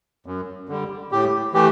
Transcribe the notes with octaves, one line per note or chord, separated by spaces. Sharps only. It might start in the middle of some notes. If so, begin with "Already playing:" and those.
F#2
D3 G3
A2 G4
E3 A3 G4